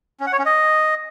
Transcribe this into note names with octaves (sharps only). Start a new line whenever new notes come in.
C#4
F#5
C#5
C#4
D#5